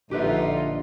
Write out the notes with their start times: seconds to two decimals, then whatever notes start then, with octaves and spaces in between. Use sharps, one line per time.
0.11 A#1 D3 D#4 F4 G4 B4 E5